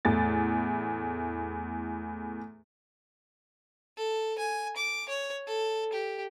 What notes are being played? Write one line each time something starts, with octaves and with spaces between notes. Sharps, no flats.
E2 A2 A6
A4
G#5
D6
C#5
A4
G4